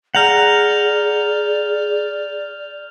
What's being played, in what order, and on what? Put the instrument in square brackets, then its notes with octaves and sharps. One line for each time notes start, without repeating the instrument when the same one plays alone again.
[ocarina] G#4 [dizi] D5 [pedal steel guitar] F#5 A#5 [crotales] F6 G6 F7